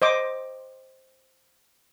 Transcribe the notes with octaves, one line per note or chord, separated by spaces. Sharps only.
C5 D#5 D6